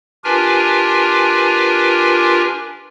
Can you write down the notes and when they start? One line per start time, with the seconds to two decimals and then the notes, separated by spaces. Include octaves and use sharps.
0.24 D4 F4 G4 A#4 B4 G#5